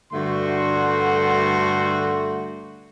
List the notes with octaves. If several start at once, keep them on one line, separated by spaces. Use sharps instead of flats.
G2 D3 A3 F#4 C6